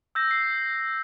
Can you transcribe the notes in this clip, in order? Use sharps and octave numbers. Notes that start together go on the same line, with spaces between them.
E6 G6 A#6
C7